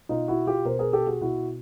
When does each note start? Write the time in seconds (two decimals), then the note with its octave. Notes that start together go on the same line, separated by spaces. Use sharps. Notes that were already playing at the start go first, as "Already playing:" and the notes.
0.09 B2 D#4 F4
0.28 E4 F#4
0.47 F4 G4
0.65 B2 A#4 C5
0.79 G#4 A#4
0.93 G4 A4
1.07 F#4 G#4
1.21 B2 E4 F#4